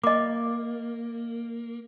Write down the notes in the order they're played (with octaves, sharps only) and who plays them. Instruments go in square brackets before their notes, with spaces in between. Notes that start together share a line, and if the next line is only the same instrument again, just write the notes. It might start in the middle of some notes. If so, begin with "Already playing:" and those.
[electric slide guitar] A#3 [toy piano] D#5 D6